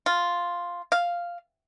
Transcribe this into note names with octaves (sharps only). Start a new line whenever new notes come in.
F4
F5